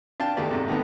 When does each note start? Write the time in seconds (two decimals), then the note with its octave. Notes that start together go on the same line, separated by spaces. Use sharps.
0.20 D4 F5 G5 A5
0.37 E2 D#3 A3 G4 D5
0.49 G#2 C3 A4
0.68 D#3 A3 B3